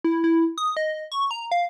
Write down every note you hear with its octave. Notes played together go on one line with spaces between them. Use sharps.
E4
E4
D#6
D#5
C#6
A#5
F5